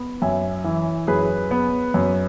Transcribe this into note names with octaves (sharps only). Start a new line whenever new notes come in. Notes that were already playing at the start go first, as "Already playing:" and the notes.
Already playing: B3
F#2 E5 G#5
E3
F#2 G#4 B4
B3
F#2